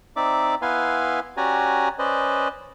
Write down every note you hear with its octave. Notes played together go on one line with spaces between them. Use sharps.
C4 D#4 D5 E5 D6
B3 E4 B4 F5 G#5 C6
C#4 F#4 G4 D5 G#5 A#5
C#4 B4 C5 D5 D#5